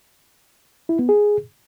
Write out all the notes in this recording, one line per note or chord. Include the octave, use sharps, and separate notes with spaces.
E4
B3
G#4